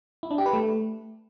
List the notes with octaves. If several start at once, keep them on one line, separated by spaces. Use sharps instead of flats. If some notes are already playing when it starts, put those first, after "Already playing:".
E4
D4
G4
B4
A3